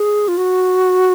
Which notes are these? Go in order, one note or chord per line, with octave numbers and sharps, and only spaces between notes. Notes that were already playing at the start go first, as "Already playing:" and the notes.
Already playing: G#4
F4
F#4